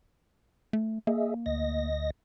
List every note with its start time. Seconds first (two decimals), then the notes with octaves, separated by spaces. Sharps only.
0.73 A3
1.07 A#3 G#4 D#5 E5
1.46 D2 D#5 A#6